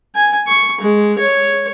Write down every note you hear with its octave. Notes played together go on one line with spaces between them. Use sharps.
G#5
C#6
G#3
C#5